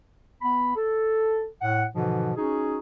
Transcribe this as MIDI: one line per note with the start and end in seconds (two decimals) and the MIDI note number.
0.42 0.75 59
0.42 0.75 83
0.75 1.45 69
1.62 1.84 45
1.62 1.84 78
1.93 2.32 44
1.93 2.32 47
1.93 2.32 50
1.93 2.32 52
1.93 2.32 53
2.37 2.79 61
2.37 2.79 63
2.37 2.79 66
2.37 2.79 68